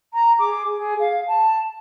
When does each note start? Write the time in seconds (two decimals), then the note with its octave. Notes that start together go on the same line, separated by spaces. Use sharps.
0.14 A#5
0.39 G#4 D6
0.73 G#4
0.98 F5
1.28 A5